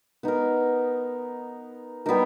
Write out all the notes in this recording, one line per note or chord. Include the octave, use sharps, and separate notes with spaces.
B3 D#4 A#4
G3 B3 D#4 A#4